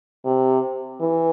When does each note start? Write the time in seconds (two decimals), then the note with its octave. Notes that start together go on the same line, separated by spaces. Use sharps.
0.25 C3
1.01 E3